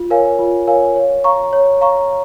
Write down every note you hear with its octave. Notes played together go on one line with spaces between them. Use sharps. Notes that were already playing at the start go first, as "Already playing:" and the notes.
Already playing: F4
A#4 C#5 F5 G#5
F4
A#4 C#5 F5 G#5
C#5
F5 A#5 C#6
C#5
F5 A#5 C#6